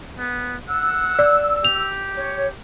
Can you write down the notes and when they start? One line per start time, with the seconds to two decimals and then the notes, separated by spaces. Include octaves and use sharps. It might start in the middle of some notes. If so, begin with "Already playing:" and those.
0.19 B3
0.69 F#5 E6
1.19 D5
1.64 G4 F7
2.15 C#5